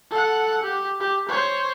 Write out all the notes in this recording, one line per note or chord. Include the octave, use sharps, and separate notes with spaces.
A4 F#5
G4
G4
C5 C#5